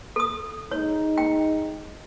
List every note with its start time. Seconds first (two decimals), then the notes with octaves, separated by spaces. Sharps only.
0.16 A4 D#6
0.71 G#3 D#4 C#5
1.18 G5